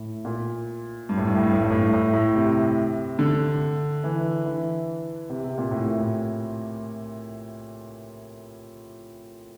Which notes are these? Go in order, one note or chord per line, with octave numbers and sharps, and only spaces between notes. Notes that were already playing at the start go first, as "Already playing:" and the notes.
Already playing: A2
A#2
G2
A2
G2
A2
G2
A2
G2
A2
G2
A2
A2
C3
D3
E3
E3
C3
C3
A#2
A2
A#2
A2